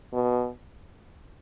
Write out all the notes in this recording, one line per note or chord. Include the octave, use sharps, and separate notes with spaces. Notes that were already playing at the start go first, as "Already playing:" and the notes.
B2